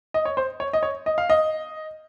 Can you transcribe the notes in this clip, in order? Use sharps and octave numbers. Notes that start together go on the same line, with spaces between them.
D#5
C#5
C5
C#5
D#5
C#5
D#5
F5
D#5